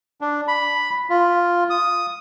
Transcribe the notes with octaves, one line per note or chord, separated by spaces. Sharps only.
D4
B5
F4
D#6